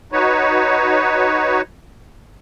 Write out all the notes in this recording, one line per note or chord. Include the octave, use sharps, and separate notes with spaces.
D#4 F#4 B4 C#5